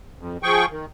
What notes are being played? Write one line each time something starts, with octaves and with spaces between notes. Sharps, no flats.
F2
F3 G#4 G5 C#6
D#3